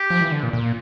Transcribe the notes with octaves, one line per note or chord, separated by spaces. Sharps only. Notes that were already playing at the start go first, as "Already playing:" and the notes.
Already playing: G4
F3
E3
D3
A#2
A#2